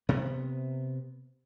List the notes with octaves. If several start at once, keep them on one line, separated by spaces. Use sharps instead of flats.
C3 B3